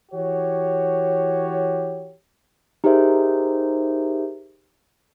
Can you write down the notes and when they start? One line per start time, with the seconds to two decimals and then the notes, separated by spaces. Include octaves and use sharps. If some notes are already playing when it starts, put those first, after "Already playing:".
0.12 E3 F#4 G4 C#5
2.84 D#4 G4 G#4 A#4 C5 E5